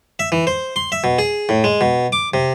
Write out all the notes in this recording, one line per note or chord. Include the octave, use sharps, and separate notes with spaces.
E5
E3
C5
C6
E5
B2
G#4
A2
G#3
B2
D6
C3